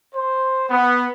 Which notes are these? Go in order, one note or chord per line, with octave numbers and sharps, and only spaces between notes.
C5
B3